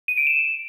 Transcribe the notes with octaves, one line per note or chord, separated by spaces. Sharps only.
D#7
D7
E7